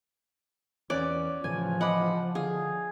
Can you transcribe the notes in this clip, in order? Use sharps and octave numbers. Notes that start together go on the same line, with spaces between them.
E2 E3 C#4 C#5 D5 F#6
A2 C#3 E3 F3 G#5
D#5 F#5 B5 D6
D3 G#4 F5